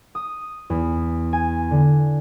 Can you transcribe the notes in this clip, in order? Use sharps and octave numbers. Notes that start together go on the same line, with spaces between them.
D#6
E2
G#5
D3